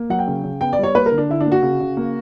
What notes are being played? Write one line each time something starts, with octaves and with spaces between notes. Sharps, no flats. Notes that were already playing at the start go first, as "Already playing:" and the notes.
Already playing: A#3
F#3 F#5
G5
C#3
C#3
B3 G5
D5
G3 C#5
A#3 B4
A#4
D3
D4
D3 E4
D4
A#3
F#4
C#3
C#3
A#3